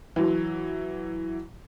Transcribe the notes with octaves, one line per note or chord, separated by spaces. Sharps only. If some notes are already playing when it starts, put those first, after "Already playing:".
E3 F#3